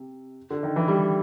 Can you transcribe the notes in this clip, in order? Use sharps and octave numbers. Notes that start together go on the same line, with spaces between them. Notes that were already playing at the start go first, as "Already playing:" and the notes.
Already playing: C3
D3
D#3
E3
G3